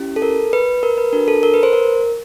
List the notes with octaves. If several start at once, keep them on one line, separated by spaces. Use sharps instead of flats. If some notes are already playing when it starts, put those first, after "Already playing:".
Already playing: C#4 E4 G4
A4
A#4
B4
A#4
B4
D4 F#4 A4 A#4
A4
A#4
B4
C5
A#4